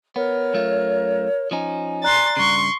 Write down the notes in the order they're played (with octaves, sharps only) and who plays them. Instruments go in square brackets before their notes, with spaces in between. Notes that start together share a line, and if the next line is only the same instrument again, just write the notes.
[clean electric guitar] B3 [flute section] A#4 C#5
[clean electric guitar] F#2 A3 F4
[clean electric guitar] F3 C#4 D#4 [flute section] G#5
[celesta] D5 A#5 F#6 [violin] C6 A6
[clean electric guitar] G2 C#3 [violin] C6 C#6